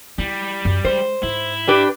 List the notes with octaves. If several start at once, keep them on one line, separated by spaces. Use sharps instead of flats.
G3 E4
F#2
G#3 C5
G#2 E4
D4 G4 B4